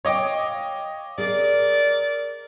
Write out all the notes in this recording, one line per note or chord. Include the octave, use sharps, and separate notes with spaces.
C#5 D#5 F5 G5 D6
G#4 A#4 D5